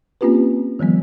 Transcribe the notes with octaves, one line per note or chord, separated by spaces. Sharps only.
A#3 C4 C#4 F4 G4 B4
D#3 F3 G3 B3